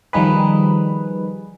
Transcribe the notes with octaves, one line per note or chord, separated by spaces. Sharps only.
D#3 F3 G3 D#4 G#4 B4